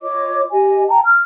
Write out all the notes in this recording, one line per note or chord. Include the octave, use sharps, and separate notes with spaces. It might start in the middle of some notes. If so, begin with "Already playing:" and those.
F4 C#5 D#5 D6
G4 D#5 G#5
G5 A5 A#5
F6